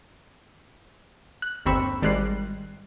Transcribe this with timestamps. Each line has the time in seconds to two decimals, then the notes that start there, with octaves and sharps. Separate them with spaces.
1.42 F#6
1.66 G1 D#2 C4 B5 C#6 E6
2.02 G#1 G3 G#3 F#6 C7